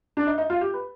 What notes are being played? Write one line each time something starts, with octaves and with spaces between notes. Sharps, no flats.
D4
D#4
D#4
F4
G4
B4